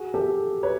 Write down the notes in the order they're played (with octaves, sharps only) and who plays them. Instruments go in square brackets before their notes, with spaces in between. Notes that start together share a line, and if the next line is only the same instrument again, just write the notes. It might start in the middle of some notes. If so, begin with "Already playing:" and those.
Already playing: [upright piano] F#4 G#4
G4 A4
B4 C#5